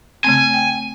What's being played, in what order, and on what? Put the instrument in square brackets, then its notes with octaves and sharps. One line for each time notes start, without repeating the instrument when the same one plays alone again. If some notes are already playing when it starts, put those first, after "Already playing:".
[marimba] C#3 A3 C4 [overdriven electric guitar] G#5
[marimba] G5